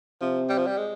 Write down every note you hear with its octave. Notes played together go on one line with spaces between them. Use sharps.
C3 F3
G3
F3
G3
G#3